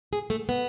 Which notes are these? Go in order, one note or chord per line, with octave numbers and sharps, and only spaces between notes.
G#4
A3
B3